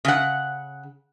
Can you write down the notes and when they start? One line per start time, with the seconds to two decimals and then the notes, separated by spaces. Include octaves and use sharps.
0.05 C#3 F#5